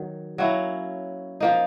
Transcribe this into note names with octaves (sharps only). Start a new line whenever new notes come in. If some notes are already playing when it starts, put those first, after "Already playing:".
Already playing: D#3 F#3
F#3 A#3 C#4 E4
F3 A#3 D#4